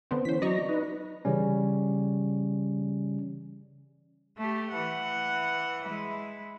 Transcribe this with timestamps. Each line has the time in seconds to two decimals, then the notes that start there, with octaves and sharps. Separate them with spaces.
0.11 D3 B3 C4
0.25 E3 C#4 C5 B6
0.42 F#3 D5 D#5 A#5 C#6
0.69 D#4 B4
1.25 C#3 E3 G3 C#4
4.38 A3 G4
4.71 E3 F#5
5.85 G#3 E4